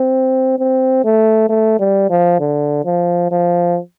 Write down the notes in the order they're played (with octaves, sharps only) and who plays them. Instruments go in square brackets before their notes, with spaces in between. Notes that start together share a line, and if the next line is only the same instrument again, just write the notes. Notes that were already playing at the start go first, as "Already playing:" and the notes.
Already playing: [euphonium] C4
C4
A3
A3
G3
F3
D3
F3
F3